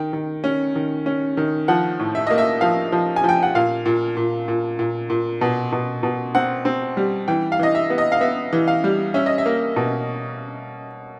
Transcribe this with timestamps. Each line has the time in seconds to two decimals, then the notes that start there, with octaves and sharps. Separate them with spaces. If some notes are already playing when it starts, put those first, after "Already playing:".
Already playing: D#3 G5
0.13 D#3
0.44 C#4
0.76 D#3
1.06 C#4
1.37 D#3
1.68 F3 F#5
2.00 A2
2.15 E5
2.27 A#3 D#5
2.38 E5
2.61 F3 F5
2.92 F3
3.16 G#5
3.24 F3 G5
3.43 F#5
3.55 A#2 F5
3.86 A#2
4.17 A#2
4.48 A#2
4.79 A#2
5.10 A#2
5.41 B2
5.72 B2
6.03 B2
6.35 C4 F#5
6.65 C4
6.97 G3
7.28 E3 G5
7.52 F5
7.59 E3 D#5
7.75 E5
7.90 B3
7.98 D#5
8.12 F5
8.21 B3 E5
8.53 E3
8.68 F5
8.84 G3
9.14 C#4 E5
9.26 D#5
9.38 E5
9.46 A#3
9.76 B2